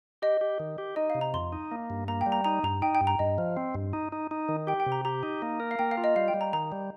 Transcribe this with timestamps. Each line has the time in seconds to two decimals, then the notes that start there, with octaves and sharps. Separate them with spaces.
0.22 G4 D#5
0.41 G4
0.60 D#3
0.78 G4
0.96 D#4 D#5
1.10 C3 F5
1.21 A#5
1.34 F2 C6
1.53 D#4
1.72 A#3
1.90 G2
2.08 A#3 A#5
2.21 G5
2.26 G3
2.32 A#5
2.45 D#4 A#5
2.63 G2 A#5
2.82 D#4 G5
2.95 G5
3.01 G2
3.07 A#5
3.19 G2 D#5
3.38 F3
3.57 C4
3.75 G2
3.93 D#4
4.12 D#4
4.31 D#4
4.49 D#3
4.67 G4 G5
4.80 G5
4.86 C3
4.92 A#5
5.05 G4 A#5
5.23 D#4
5.42 A#3
5.60 A#4
5.71 F5
5.79 A#3 G5
5.91 F5
5.97 F4
6.04 D#5
6.16 G3 F5
6.28 G5
6.34 G3
6.41 A#5
6.53 D#3 A#5
6.72 G3